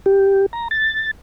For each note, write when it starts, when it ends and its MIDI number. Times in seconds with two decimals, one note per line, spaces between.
0.06 0.46 67
0.53 0.68 82
0.71 1.11 93